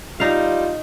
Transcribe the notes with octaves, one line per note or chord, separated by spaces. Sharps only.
G3 D#4 F4 F5